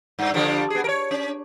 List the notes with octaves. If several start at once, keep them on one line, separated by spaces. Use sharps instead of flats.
G2
D3 F3 G3
B3 G#4
A#4 C#5
C#4